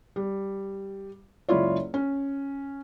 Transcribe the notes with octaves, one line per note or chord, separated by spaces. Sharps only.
G3
F#1 C#2 E4 F4 C#5 D5
C#4